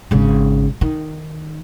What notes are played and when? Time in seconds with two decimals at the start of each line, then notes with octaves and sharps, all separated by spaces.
0.11 G#1 C#3
0.81 D#3